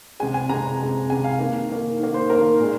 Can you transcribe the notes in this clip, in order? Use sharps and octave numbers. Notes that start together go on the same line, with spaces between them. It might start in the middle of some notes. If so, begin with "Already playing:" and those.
C3 G#3 G#5
G#5
C3 G#3 A#5
C3 G#3
C3 G#3 G#5
F5
D#3 A#3
D#3 A#3
D#3 A#3
C5
D#3 A#3 A#4
A#2 G#3